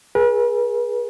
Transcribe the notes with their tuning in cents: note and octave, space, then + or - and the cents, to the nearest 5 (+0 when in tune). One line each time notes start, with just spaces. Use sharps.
G#4 +0 B4 -40